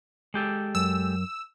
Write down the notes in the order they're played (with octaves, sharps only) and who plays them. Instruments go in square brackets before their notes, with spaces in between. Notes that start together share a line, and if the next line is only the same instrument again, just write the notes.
[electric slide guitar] G#3 G4 A4
[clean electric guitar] F#2 [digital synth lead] E6